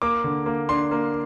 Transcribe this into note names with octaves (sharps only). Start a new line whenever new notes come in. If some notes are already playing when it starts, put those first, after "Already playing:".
A#3 D6
D3
A#3
D4 C6
A#3